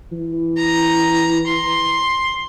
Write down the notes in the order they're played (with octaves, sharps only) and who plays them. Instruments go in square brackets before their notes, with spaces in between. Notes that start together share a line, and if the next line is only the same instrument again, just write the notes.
[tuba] E3
[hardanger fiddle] A#5
C6